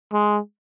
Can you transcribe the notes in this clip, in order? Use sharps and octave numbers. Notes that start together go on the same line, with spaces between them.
G#3